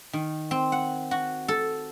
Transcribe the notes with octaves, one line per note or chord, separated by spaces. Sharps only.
D#3
C4
F#5
F#4
A4